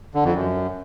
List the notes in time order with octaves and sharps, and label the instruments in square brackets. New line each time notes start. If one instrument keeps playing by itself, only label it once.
[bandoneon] D3
F2
F#2